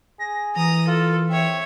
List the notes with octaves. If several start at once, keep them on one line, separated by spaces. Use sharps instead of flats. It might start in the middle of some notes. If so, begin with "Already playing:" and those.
G#4 A#6
E3 A#5 D#6
F4 A4
C4 C#5 E5